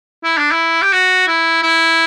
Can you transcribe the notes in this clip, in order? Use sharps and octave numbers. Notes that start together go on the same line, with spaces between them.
E4
D4
E4
G4
F#4
E4
E4